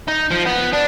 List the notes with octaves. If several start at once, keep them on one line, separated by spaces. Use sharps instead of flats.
D#4
F3
B3
D4